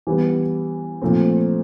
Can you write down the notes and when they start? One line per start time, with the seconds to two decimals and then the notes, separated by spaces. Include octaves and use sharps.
0.07 E3 G3 B3
1.01 A#2 F3 A3 C4